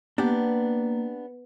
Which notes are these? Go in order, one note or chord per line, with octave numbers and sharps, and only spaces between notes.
A#3 B3 D4 G4